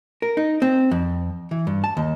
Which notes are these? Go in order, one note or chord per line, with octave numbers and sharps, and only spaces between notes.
A#4
D#4
C4
F2
E3
G2
A5
D#2